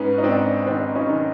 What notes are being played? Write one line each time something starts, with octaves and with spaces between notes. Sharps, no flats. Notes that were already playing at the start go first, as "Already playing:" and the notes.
Already playing: G#2 B3 C#4
D#4
G#1 C4 D4
D#3 C4 D4
C#4 D#4
D#3